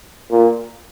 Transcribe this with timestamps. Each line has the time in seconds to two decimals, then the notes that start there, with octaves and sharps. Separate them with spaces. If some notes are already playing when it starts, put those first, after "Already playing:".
0.31 A#2